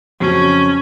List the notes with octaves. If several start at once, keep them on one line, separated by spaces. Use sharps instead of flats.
F2 C#3 F#3 C#4